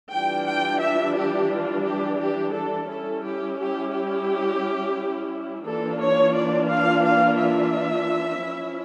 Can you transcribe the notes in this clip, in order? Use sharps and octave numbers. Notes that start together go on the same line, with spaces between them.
E3 G3 D4 F4 G5
G5
E5
G4
F4
G4
G4
A4
G3 C#4 E4 A4
G4
G4
G4
E3 A#3 D4 F4 A4
C#5
D5
F5
F5
E5
F3 C#4 E4